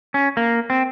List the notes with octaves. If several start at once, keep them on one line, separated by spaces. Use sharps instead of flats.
C#4
A#3
C4